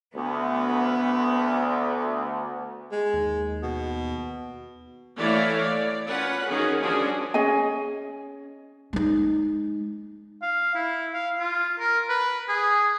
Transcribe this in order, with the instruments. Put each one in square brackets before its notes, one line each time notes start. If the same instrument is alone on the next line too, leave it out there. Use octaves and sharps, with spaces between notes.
[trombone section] D2 [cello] B3
[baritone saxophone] G#3
[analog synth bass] D#2
[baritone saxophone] B2
[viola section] E3 A3 C#5 D5 F5
D5
C#4 F4 B4 F#5
D#3 C#4 F#4 G#4
F3 G3 C#4 D4 F#4 G#4
[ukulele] C#4 G#4 D#5 G#5
[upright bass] G#3 D#4
[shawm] F5
E4
F5
F4
A#4
B4
G#4